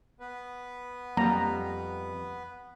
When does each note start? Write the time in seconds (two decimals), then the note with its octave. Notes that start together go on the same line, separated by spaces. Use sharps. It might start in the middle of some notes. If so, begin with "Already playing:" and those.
0.20 B3 B4
1.17 F2 F#3 G3 A#3 A#5